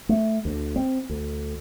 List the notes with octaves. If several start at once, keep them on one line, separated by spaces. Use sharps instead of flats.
A3
D2
C4
D2